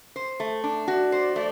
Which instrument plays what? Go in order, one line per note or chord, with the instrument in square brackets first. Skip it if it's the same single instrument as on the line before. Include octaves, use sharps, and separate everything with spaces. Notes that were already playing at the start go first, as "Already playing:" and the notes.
[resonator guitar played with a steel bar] C5
A3
D4
[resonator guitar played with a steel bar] F#4 [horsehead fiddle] D5
[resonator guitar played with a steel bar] C5
A3